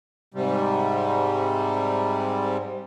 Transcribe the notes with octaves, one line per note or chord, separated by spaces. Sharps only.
G#2 C3 G3